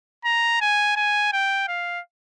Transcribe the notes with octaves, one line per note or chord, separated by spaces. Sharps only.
A#5
G#5
G#5
G5
F5